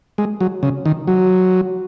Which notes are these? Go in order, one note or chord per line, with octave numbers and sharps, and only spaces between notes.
G#3
F#3
C#3
D#3
F#3